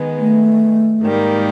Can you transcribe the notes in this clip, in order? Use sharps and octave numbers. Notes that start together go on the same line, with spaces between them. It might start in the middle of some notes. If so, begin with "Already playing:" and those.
Already playing: D#3 G#3 B3
A3
G#2 D#3 G3 A#3